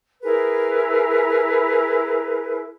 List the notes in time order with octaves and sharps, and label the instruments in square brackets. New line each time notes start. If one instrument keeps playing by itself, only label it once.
[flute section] E4 G#4 A#4 B4